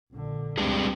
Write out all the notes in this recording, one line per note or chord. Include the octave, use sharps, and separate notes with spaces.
A#1 D3
C#2 G3 G#3 C4 D4